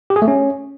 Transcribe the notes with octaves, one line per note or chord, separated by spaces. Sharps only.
G4
G#4
A3
C#4